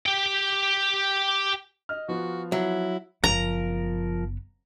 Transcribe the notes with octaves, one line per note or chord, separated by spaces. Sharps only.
G4 G5
D#5 F6
F3 B3 F4 F#4
F#3 E4
F#1 F3 B3 A#4 A#5